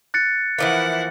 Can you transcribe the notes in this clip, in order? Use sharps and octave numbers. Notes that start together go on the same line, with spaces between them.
F#6 A6 C#7
E3 F3 A#3 E4 F#5